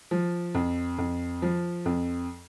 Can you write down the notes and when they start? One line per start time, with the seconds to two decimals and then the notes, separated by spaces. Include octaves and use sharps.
0.11 F3
0.55 F2
0.98 F2
1.42 F3
1.86 F2